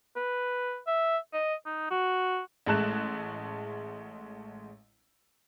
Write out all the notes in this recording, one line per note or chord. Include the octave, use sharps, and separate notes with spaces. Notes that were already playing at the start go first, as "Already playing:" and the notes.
B4
E5
D#5
D#4
F#4
A1 G#3 A3 A5 F#6 E7